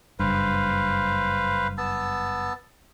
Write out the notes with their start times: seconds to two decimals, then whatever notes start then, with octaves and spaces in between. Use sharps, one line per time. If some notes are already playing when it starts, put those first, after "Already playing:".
0.19 F#1 G2 B4 C5 F5
1.78 B3 A5 E6